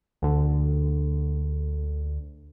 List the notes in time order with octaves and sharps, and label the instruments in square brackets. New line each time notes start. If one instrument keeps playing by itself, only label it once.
[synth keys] D2 D3